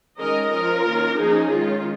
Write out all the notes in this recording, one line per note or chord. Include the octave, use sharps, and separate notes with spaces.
D#3 G#3 C#4 A#4 D#5
F3 C#4 F4 A#4
D#3 A#3 C#4
F3 A#3 C#4 D#4 G#4
D#3 G#3 C#4 F4